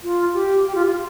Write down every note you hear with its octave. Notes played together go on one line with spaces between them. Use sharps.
F4
G4
G4
F4
F4